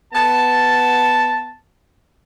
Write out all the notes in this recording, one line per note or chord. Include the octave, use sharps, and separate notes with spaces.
B3 A5